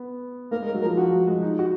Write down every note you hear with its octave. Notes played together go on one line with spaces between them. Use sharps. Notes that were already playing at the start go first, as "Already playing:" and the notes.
Already playing: B3
A#3 A#4
G#3
A#4
F#3
A#4
F3
F3 F#4
F#3
G#3
D#4
F#4